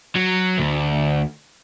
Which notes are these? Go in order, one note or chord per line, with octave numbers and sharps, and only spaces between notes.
F#3
D2